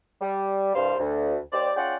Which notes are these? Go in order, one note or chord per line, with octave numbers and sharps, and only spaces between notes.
G3
C2 G2 C3 G3 C5 F5
D2
D#2 G4 C5 D5
C#4 F4 G#4 D5 F#5 G5